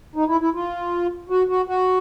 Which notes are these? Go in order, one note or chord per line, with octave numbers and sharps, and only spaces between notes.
D#4
E4
E4
F4
F#4
F#4
F#4